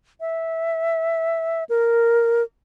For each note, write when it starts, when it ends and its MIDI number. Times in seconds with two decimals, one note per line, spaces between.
0.21 1.64 76
1.69 2.43 70